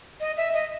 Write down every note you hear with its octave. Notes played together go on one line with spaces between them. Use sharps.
D#5
E5
D#5